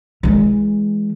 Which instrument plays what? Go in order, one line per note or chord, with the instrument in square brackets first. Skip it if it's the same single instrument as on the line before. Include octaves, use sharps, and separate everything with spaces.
[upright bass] E3 G#3